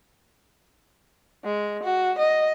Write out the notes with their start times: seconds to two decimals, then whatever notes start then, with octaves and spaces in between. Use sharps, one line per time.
1.44 G#3
1.83 F#4
2.18 D#5